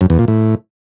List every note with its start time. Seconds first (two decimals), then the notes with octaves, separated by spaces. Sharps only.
0.01 F#2
0.10 E2
0.19 A#2
0.28 A2